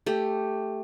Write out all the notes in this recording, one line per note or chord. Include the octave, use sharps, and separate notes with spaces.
A3 G4